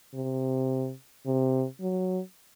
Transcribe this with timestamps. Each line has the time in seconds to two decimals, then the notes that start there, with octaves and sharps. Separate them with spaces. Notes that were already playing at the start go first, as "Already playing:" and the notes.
0.14 C3
1.26 C3
1.81 F#3